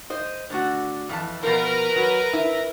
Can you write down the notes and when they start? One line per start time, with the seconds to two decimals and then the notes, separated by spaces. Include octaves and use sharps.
0.10 C5 D#5
0.50 D3 A3 F#4
1.09 F2 E3 A5
1.43 B2 F3 A#4 B4 A#5
1.96 F#3
2.33 E4